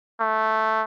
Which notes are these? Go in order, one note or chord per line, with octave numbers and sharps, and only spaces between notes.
A3